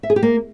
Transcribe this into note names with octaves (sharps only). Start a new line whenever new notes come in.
E5
G#4
G4
A#3